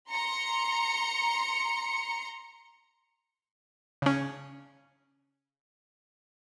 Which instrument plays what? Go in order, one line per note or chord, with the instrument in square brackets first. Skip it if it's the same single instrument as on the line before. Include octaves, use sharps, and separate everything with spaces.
[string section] A#5 C6 C#7
[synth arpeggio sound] C#3 C#4